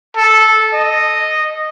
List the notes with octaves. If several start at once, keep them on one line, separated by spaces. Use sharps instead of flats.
A4
D#5